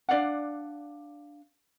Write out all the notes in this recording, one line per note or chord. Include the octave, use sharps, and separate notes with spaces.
D4 D5 F5 F#5